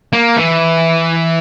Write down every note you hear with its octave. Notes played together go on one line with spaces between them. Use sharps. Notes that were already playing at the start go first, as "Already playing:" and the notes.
A#3
E3